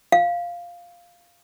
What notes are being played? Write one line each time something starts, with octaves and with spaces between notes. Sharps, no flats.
F5